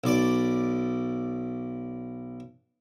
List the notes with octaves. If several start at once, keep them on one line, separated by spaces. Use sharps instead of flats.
B1 D5